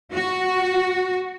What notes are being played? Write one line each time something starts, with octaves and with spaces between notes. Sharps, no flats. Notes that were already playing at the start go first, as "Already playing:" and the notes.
F#4